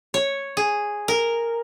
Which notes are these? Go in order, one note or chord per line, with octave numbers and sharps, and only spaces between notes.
C#5
G#4
A#4